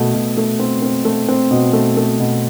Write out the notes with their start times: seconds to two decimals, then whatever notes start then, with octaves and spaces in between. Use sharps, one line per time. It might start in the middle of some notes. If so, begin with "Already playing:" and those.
Already playing: B2 A3
0.14 B2
0.37 A3
0.59 C4
0.82 C4
1.05 A3
1.28 C4
1.51 B2
1.73 A3
1.97 A3
2.20 B2